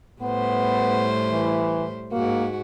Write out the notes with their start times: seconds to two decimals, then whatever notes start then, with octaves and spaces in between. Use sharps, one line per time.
0.22 A2 G3 B3 C5
1.32 E3
2.12 G#2 A#3 F#4